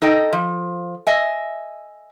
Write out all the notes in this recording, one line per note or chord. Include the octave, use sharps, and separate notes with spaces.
D#4 A4 D#5 G5
F3
D#5 E5 G#5